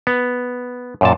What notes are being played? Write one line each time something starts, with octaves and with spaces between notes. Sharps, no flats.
B3
F#2 A#2 A5